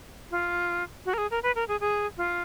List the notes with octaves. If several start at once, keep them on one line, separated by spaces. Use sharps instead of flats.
F4
F#4
A#4
G#4
A#4
B4
A#4
G#4
G#4
F4